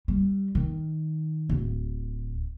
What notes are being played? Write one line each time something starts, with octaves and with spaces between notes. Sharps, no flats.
G3
D#3
D1